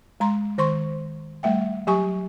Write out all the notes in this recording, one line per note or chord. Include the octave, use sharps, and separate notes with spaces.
G#3 A#5 C6
D#3 C5 C6 C#6
G3 A3 E5 G5
F#3 G4 G#5 C#6